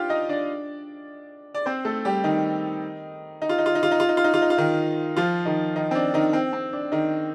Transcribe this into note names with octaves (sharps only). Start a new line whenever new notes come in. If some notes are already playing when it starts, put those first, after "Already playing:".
Already playing: D4 F4 G4 F5 G5
D#4 D#5
D4 D5
D5
C4 C5
A3 A4
G3 G4
D#3 D#4
D#4
F4
D#4
F4
D#4
F4
D#4
F4
D#4
F4
D#4
F4
D#4
F4
D#3 D#4
F3 F4
D#3 D#4
D#3 D#4
C4
D4
D#3 D#4
C4
C4
D4
D#3 D#4